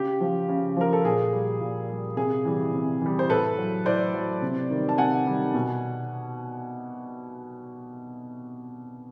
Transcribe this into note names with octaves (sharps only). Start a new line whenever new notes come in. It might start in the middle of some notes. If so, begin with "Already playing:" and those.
Already playing: C#3 G4
F3
C#3
F3 A#4
A4
A#2 G#4
G3
A#2
G3
C3 G#4
E3 G3
C3
E3 G3
C5
A2 A4 B4
F#3
A2 C5 D5
F#3
C3
D#3 G3
A5
C3 F#5 G#5
D#3 G3
B2